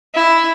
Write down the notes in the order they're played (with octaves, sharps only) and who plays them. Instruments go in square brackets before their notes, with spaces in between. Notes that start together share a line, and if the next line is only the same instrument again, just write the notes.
[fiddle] E4